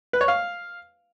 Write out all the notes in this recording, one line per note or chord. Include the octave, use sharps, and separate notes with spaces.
B4
C#5
F5